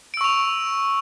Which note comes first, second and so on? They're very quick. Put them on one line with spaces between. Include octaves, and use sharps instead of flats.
D7 E6 C#6 F7